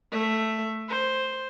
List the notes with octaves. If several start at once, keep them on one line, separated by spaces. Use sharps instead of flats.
A3 E5
C5